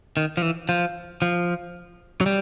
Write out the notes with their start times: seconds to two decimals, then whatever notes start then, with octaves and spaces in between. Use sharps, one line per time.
0.17 D#3
0.37 F3
0.42 E3
0.69 F3
1.22 F3
2.21 F#3
2.26 G3